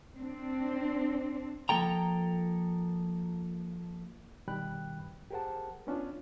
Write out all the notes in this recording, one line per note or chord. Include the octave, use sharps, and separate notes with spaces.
C4 D4
F3 A#3 A4 G5 A#5
B2 D#3 G3 G5 B5 F#6
G2
G4 G#4 A#4 C5 F#5 A5
B3 C#4 D4 F4